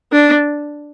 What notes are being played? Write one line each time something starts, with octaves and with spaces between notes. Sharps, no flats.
D4